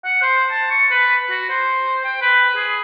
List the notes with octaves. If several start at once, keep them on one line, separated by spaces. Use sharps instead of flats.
F#5
C5
A5
C#6
B4
F#4
C5
G5
B4
G#4